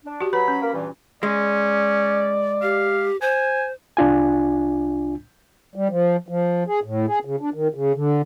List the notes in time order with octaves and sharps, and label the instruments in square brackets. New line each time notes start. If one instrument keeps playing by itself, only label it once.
[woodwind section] D4
[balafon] F#4 G4
[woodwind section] F#3 B5 [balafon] B4
[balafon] C#4
[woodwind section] A#3 A#4 B5
G2 A#2 E3
[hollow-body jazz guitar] G#3 [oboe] C#4 [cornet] D5
[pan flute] G4 [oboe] F5
[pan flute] C5 [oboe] G#5
[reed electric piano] C2 D4 F4 G#5
[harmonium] G3
F3
F3
G#4
A2
G#4
C#3
D4
D#3
C#3
D3